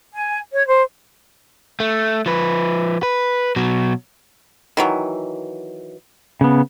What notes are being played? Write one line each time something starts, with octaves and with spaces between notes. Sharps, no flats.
G#5
C#5
C5
A3
F3 B4
B4
B2 F#3
D#3 E3 F#3
C#3 B3